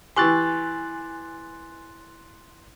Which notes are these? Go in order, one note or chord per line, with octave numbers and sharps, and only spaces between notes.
E3 E4 G4 G#5 C6 C#6 F#6 A6